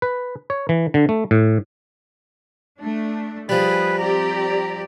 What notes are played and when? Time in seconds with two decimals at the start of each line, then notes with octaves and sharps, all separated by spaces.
0.02 B4
0.50 C#5
0.69 E3
0.94 D3
1.09 A3
1.31 A2
2.80 A3 D4
3.49 F3 G3 G#4 B4
3.98 C4 G4 D5 A#5